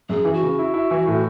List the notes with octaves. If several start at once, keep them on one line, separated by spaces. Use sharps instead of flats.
F#2 G#4
E3
F#4
C#3
E4
E4
E3
A2